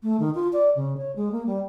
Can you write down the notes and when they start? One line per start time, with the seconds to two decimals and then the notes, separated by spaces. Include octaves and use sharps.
0.02 A3
0.19 D#3
0.34 F4
0.52 D5
0.75 C#3
0.97 C#5
1.15 G#3
1.31 A#3
1.46 G3